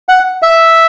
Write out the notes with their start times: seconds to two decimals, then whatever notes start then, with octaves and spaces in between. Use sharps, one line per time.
0.09 F#5
0.42 E5